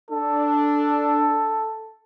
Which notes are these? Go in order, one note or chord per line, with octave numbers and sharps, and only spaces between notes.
D4 A4